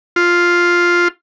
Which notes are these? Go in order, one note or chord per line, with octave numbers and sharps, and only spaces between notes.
F4